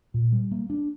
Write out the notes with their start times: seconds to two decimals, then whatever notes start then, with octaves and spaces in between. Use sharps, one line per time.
0.14 A#2
0.32 G3
0.51 A#3
0.70 D4